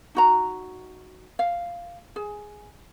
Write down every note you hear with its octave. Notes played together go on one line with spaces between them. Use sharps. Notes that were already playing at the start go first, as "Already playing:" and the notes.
D#4 F#4 A#5
F5
G#4